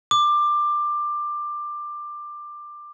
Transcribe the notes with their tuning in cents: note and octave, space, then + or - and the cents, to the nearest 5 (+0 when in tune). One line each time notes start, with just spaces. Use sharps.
D6 +15